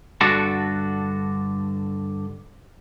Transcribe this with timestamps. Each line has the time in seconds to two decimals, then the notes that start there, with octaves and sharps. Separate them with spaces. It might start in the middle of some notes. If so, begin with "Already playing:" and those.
0.21 G2 D3 D4 F#4 A4